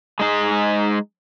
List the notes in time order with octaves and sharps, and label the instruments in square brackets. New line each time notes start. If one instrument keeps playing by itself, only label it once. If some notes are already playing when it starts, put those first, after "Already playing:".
[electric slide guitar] G#3 D#4 G#4